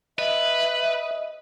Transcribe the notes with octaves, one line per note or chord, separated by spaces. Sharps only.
B4 D#5 E5